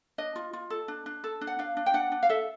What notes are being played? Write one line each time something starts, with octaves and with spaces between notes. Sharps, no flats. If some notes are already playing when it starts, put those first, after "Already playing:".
D4 D#5
F4
F4
A4
D4
D4
A4
D4
F#5
D4 F5
D4
G5
D4 F#5
D4
F5
A4 E5